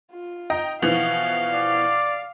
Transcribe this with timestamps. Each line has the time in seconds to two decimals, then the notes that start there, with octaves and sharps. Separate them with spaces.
0.12 F4
0.50 D#5 G5 A#5
0.82 B2 E3 F3 F5
1.52 D5